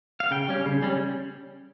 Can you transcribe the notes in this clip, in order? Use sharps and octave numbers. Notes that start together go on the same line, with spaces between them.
F5
C#3 G5
G3 C#4
C#3
G3 C#4